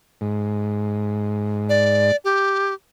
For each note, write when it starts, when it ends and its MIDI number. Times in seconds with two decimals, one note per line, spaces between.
0.21 2.11 44
1.69 2.16 74
2.25 2.74 67